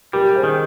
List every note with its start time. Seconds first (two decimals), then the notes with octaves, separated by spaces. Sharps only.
0.13 G3 G4 A#4
0.35 G#4 C5
0.43 D#3